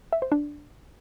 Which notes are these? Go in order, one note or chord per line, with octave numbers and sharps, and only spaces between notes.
E5
C5
D4